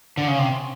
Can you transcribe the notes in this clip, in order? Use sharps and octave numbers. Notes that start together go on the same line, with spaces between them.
D3
C#3
C3